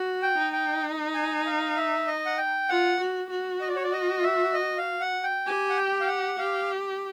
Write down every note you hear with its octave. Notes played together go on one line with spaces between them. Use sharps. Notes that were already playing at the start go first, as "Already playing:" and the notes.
Already playing: F#4
G5
D#4
G5
G#5
F5
E5
D#5
F#5
G5
F4 F#5
F#4
F#4
D#5
D5
C#5
D5
D#5
E5
D#5
F5
F#5
G5
G4 G#5
F#5
G5
F5
F#5
G4 F5